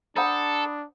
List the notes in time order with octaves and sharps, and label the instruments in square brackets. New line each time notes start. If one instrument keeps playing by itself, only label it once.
[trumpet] D4 [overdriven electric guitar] A4 [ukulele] C5 F#5 [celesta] A#5 B5 D#6